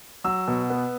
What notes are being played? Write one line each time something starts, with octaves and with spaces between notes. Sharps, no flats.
F#3 E6
B2
B3